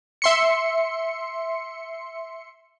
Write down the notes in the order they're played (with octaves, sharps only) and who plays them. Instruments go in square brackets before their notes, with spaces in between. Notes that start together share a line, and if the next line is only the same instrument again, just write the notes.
[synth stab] E5 C6 C#7